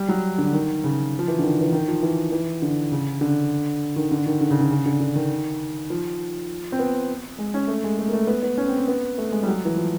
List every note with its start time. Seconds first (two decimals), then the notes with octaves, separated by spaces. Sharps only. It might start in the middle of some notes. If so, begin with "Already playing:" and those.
Already playing: G3
0.09 F#3
0.38 D3
0.53 D#3
0.84 C#3
1.19 F3
1.28 E3
1.39 D3
1.43 D#3
1.61 E3
1.72 D#3
1.88 F3
2.03 E3
2.32 E3
2.62 D3
2.92 C#3
3.21 D3
3.96 D#3
4.12 D3
4.26 D#3
4.41 D3
4.50 C#3
4.61 D3
4.71 C#3
4.86 D3
5.00 D3
5.16 D#3
5.90 F3
6.72 C4
6.79 B3
7.38 G#3
7.54 C#4
7.68 A3
7.84 G#3
7.99 A3
8.08 A#3
8.13 A3
8.27 B3
8.43 B3
8.58 C#4
8.68 C4
8.78 C4
8.88 B3
9.18 A3
9.32 G#3
9.43 G3
9.48 F#3
9.65 E3
9.77 F3